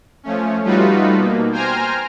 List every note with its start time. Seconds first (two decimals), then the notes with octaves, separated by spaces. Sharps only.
0.23 F3 A3 C#4
0.63 G3 A3 D#4 F4 F#4 B4
1.17 B2 A#3
1.52 C5 G5 G#5 A#5 F6